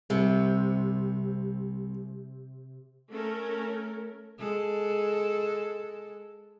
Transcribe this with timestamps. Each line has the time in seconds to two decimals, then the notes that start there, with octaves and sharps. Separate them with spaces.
0.10 C2 C3
3.11 A3 C#4 A4 A#4
4.39 G#3 A4